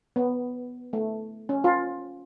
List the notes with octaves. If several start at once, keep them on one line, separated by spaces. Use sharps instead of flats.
B3
A3
C#4
F4